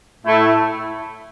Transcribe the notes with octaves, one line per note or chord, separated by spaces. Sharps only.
A2 A3 E4